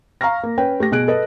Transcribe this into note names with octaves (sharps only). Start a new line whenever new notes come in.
F5 A#5 C#6 F6 A#6
A#3
C#4 B4 G5
A3 G4 A#6
B2 G#4 F#6 D7
A4 B4 D#5